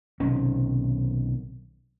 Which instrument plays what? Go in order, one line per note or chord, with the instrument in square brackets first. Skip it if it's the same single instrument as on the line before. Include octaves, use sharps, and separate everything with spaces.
[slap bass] B1 C3 D#3 C#4